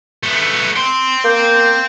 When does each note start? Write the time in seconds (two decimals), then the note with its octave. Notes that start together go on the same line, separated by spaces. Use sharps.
0.23 A3 B3
0.76 G5 C6
1.24 A#3 G6